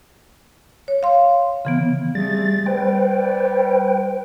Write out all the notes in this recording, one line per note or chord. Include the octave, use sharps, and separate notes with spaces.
C#5
F5 C6
C#3 E3 B3
G3 A3 C4 G#4 A6
G3 B4 C5 G5